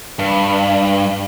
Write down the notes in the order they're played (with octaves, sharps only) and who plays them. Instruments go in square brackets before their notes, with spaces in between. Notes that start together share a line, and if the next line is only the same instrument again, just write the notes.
[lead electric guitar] G2